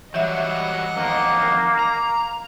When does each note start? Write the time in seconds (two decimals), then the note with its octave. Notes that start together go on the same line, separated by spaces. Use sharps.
0.14 E3 F#3 G3 D#5 E5 F#5
0.97 F2 D#3 A#3
1.79 A#5